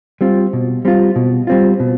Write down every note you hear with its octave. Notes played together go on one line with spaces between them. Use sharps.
G3 C4 F4
B2
G3 C4 F4
B2
G3 C4 F4
B2